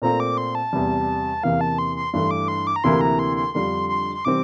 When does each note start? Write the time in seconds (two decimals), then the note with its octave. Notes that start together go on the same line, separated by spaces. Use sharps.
0.02 A#2 A3 C4 F4 A#5
0.20 D6
0.38 C6
0.55 A5
0.73 E2 C3 G3
1.43 E2 C3 E3 A#3 F5
1.61 A5
1.78 C6
1.96 C6
2.13 G2 E3 A3 C6
2.31 D6
2.48 C6
2.67 D6
2.76 A#5
2.84 D2 C3 E3 A#3 E4 C6
3.01 A#5
3.19 C6
3.36 C6
3.54 F2 D3 G3 D4 F4 C6
3.89 C6
4.15 C6
4.25 C3 E3 G3 C4 D6